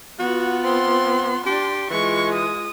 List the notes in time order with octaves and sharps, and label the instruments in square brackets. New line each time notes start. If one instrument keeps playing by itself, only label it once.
[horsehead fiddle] B3 F4 [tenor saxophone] F#4
[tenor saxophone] C4 [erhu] C6
[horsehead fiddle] D4 [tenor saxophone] G4 [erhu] C6
[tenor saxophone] E3 [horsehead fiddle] G#3 F4 [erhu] C#6
[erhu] D#6